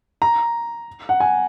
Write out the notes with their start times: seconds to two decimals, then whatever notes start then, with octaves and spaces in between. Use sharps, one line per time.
0.22 A#5
1.09 F#5
1.20 G#5